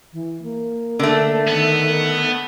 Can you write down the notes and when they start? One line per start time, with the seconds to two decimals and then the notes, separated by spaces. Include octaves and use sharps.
0.13 E3
0.43 A#3
0.99 D3 A3
1.48 D#3 B3